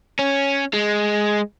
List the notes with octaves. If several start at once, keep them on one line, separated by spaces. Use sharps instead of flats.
C#4
G#3